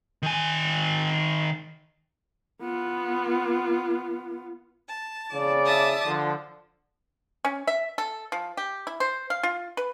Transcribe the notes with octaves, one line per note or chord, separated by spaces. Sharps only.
D#3 G#5
B3 F4
A5
C#3 D5
E5 A5 D#6
D3 F3
C#4
E5
A4
F3
G4
E4
C5
F5
F4
B4